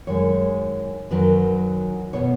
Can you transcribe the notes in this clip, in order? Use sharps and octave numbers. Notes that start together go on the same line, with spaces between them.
F#2 D#3 G#3 C#5
F#2 D#3 F#3 B4
B2 B3 C#5